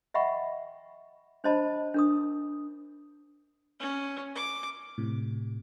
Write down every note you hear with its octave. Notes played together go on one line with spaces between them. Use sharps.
D#5 E5 F#5 G5 B5 C#6
D4 C5 C#5 D#5 A5 B5
D4 A#4 D#6
C#4
D6
A2 C3